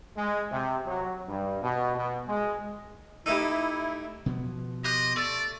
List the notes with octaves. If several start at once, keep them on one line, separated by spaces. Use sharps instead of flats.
G#3
C3
F#3
G2
B2
B2
G#3
A3 D#4 E4 G4 E5 E6
B2 F3 B3
G4 D#5 C6 F#6
A3 D5